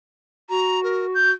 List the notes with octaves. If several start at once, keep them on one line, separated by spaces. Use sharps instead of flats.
F#4 A#5
A#4
G6